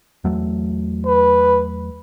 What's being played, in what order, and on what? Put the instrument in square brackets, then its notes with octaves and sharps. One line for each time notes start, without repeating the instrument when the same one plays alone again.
[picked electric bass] E2 F#3 A3
[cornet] B4